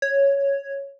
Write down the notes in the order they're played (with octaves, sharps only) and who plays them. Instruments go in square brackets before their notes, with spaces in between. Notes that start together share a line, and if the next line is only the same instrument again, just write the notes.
[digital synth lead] C#5